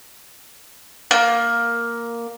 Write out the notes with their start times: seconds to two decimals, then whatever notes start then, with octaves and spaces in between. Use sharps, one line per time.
1.11 A#3